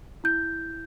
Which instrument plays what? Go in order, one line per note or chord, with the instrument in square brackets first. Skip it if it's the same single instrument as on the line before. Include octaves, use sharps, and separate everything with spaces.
[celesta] E4 G6